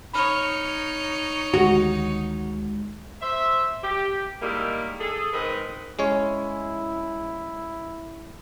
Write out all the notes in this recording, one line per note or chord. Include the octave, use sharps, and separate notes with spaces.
D#4 C#5 B5 F6
D2 D#3 G#3 F#4
C5 E5
G4
D#3 G3 G#3 A#3 E4
G#4 A4
G#2 D#3 C4 A#4 B4 D#5
G#3 C#4 E4 C#5